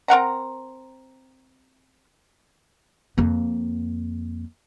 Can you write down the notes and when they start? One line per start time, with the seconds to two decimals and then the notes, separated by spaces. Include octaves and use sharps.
0.08 C4 A#4 F#5 A#5
3.18 F2 A#3